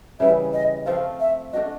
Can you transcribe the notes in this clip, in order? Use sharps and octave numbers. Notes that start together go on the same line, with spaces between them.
C#3 E3 G3 E5
D#5
F3 A3 C4 F4 F5
E5
A3 D4 F#4 D#5